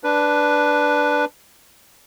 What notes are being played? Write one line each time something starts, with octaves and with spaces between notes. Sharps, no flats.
D4 B4